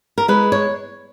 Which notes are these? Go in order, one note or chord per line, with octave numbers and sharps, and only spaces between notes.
A#4
G#3 B4
C#5